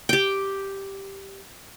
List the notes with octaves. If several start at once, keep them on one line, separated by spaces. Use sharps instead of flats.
G4 G5